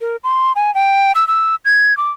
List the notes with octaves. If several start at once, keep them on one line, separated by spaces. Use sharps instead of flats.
A#4
C6
G#5
G5
E6
E6
G#6
D6